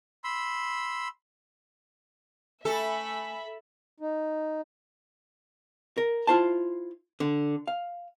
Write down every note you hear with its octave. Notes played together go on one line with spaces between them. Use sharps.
B5 C6 E6
A3 A4 E5 G#5 B5
D#4
A#4
E4 F4 C5 A5
D3
F5